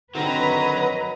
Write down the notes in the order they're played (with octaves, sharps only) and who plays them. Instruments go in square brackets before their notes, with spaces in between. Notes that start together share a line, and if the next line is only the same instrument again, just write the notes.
[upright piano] D3 D#3 C4 [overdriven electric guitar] F#3 [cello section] B4 [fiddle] D#5 A#5